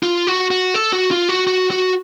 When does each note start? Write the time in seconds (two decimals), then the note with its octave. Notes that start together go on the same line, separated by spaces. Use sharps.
0.03 F4
0.27 F#4
0.51 F#4
0.74 A4
0.93 F#4
1.11 F4
1.29 F#4
1.47 F#4
1.71 F#4